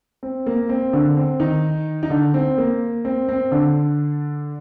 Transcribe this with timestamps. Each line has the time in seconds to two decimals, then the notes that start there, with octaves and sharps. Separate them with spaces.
0.23 C4
0.46 A#3
0.69 C4
0.93 D3 D4
1.17 C4
1.40 D#3 D#4
2.03 D#4
2.10 D3 D4
2.34 C4
2.58 A#3
3.05 C4
3.29 C4
3.51 D3 D4